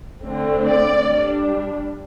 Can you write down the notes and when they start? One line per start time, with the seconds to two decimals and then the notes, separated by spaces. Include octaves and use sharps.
0.24 D3 A3 C4
0.66 D5
1.09 G3 D4